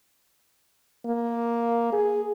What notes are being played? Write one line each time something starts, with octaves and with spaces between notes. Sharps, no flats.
A#3
G#4